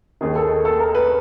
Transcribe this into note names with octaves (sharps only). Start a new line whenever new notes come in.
D#2 D#3 G#4
A4
A4
A#4
B4